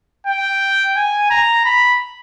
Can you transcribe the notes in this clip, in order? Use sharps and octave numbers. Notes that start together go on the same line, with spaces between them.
G5
G#5
A#5
B5